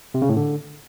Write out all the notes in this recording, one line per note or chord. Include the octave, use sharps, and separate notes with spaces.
C3
C#3
A2
D3